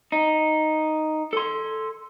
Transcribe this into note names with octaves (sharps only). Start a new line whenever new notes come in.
D#4
A4 C6